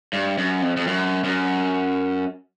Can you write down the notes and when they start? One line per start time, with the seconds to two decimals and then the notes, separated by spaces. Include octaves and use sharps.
0.13 G2
0.38 F#2
0.62 F2
0.77 F2
0.87 F#2
1.24 F#2